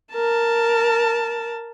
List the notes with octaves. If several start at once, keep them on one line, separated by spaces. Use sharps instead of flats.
A#4 A5